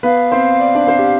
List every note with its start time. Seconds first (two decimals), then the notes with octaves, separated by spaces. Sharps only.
0.03 B3 B4 F5
0.32 C4 C5
0.60 D5
0.75 D4 D5
0.87 C4 C5
0.99 G4